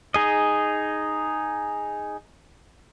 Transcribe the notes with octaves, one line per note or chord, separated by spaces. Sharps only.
D#4 G#4 D#5